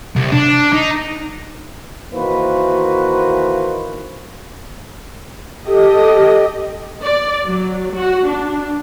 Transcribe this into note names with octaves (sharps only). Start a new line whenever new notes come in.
C2
D4
D#4
D#3 E3 A#3 F#4 B4 C5
G4 A4 D#5
D5
F#3
F#4
D4